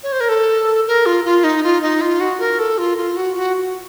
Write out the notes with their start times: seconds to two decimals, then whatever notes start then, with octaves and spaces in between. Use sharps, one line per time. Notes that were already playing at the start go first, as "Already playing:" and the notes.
0.03 C#5
0.12 C5
0.20 A#4
0.29 A4
0.87 A#4
1.06 F4
1.25 F4
1.44 D#4
1.63 F4
1.82 D#4
2.01 F4
2.20 F#4
2.40 A#4
2.59 A4
2.78 F4
2.98 F4
3.17 F#4
3.35 F#4